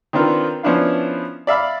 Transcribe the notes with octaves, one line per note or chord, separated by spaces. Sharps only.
D#3 C4 D4 F4 A#4 B4
F3 B3 C#4 D4 E4 F5
D5 E5 F5 B5